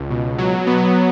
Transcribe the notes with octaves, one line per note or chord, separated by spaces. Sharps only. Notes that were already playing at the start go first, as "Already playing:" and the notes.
Already playing: C#2
B2
F#3
B3